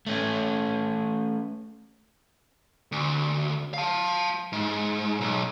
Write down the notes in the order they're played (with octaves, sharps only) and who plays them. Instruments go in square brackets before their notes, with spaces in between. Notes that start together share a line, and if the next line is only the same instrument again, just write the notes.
[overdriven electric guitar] A3 C#4
[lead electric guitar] D2
F5 A5
G#2
B1